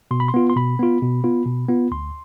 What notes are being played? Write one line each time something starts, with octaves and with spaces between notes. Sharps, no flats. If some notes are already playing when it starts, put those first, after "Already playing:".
B2 C6
B5
C6
B3 F4
C6
B2 B5
B3 F4
B2
B3 F4
B2
B3 F4
D2 C6